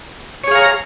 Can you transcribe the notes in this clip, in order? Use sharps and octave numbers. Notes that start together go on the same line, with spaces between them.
G#4 C#5 F5 A#5